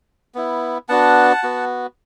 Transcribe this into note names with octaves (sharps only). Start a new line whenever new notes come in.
B3 E4
B3 D4 F#4 F#5 A5
B3 F#4